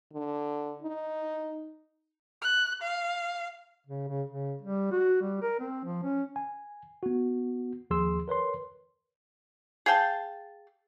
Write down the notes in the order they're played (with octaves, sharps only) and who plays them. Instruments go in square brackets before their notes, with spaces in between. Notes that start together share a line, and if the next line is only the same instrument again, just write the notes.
[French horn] D3
D#4
[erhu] F#6
F5
[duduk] C#3
C#3
C#3
G3
F#4
G3
A#4
C4
F3
C#4
[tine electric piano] G#5
B3 F#4
D#2 F3 G#4 C6 E6
A#4 B4 C#5 C6
[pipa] G#4 F5 G5 A5